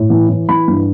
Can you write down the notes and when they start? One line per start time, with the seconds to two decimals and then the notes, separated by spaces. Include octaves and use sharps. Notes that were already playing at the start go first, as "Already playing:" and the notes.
Already playing: A2
0.10 E3
0.29 E3
0.49 E3 B5
0.68 G2